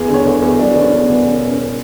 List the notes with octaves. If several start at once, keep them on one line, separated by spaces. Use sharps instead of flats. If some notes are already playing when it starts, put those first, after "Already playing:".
Already playing: E2 G#4
D3
C#5
E2
E2
F#3 D4
E2
C#4
E2
B3
E2
E1 C#4
E2
C#4